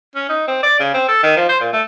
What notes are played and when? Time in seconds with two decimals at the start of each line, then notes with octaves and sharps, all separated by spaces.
0.16 C#4
0.29 D#4
0.48 C4
0.63 D5
0.80 C#3
0.94 C4
1.09 A4
1.23 D#3
1.37 F3
1.49 C5
1.61 A#2
1.73 A3